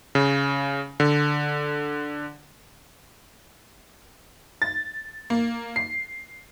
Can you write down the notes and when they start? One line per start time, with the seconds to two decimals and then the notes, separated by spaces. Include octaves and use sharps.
0.15 C#3
1.00 D3
4.62 A6
5.30 A#3
5.76 C7